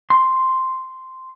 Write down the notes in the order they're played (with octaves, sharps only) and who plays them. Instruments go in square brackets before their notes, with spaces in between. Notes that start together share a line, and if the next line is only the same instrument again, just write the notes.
[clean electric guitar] C6